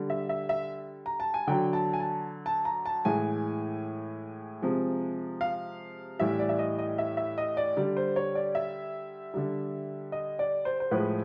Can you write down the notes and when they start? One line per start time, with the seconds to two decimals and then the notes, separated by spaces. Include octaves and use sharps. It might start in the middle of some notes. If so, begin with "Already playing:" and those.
Already playing: D3 G3
0.10 E5
0.29 E5
0.49 E5
1.06 A#5
1.20 A5
1.34 G#5
1.47 D3 F#3 G5
1.73 A5
1.93 G#5
2.00 A5
2.46 A5
2.65 A#5
2.86 A5
3.05 A2 E3 G#3 G#5
4.62 C3 F3 G#3
5.41 F5
6.19 A2 E3 G3 E5
6.39 D5
6.49 E5
6.59 D#5
6.78 D#5
6.98 E5
7.17 E5
7.38 D#5
7.57 D5
7.77 D3 G3
7.97 C5
8.16 C#5
8.35 D5
8.55 E5
9.34 D3 G3
10.12 D#5
10.39 D5
10.65 C5
10.80 C5
10.91 A2 F3 G#3 B4